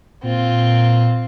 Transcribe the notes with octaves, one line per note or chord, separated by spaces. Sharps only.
A#2 C4 F4